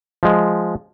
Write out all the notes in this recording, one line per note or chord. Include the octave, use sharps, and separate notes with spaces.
F3 G#3